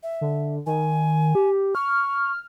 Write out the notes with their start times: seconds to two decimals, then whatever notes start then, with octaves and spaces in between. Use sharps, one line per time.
0.03 E5
0.21 D3
0.66 D#3 G#5
1.35 G4
1.75 C#6 F6